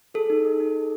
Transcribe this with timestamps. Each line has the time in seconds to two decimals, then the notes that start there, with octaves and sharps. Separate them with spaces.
0.14 G#4 A4
0.30 D#4
0.45 G#4
0.60 D#4
0.76 G#4